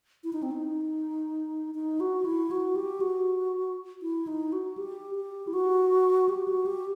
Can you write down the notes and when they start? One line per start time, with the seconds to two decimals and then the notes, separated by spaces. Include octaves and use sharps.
0.24 E4
0.33 D#4
0.43 C4
0.51 D#4
1.75 D#4
2.00 F#4
2.25 E4
2.51 F#4
2.76 G4
3.01 F#4
4.02 E4
4.27 D#4
4.52 F#4
4.78 G4
5.15 G4
5.47 E4
5.53 F#4
6.29 G4
6.48 F#4
6.66 G4